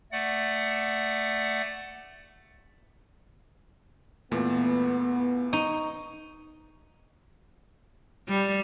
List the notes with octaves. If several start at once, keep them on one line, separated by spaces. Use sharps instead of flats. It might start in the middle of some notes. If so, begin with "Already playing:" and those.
A3 D5 F#5
E2 A#2 A3 B3
D#4 C#6
G3